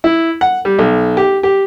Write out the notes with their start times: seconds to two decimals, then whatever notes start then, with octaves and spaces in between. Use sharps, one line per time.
0.04 E4
0.41 F#5
0.65 G3
0.79 B1
1.17 G4
1.43 G4